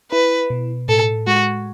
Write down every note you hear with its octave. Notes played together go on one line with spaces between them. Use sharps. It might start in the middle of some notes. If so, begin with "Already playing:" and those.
E4 B4
B2
A2 A4
G#3 F#4